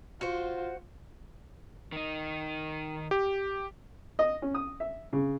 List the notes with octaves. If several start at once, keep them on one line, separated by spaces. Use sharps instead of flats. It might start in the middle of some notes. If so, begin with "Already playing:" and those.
F4 F#4 C5
D#3 D#4
G4
D#5
C#4
D#6
E5
C#3